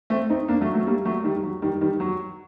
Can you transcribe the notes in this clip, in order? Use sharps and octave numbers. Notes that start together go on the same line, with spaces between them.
A3 C4
C4 D#4
A#3 D4
F#3 A3
F#3 A3
G3 A#3
F#3 A3
D#3 G3
F#3
D#3 G3
D#3 G3
F#3